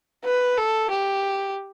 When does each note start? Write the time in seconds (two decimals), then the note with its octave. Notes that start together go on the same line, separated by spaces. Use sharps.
0.24 B4
0.57 A4
0.90 G4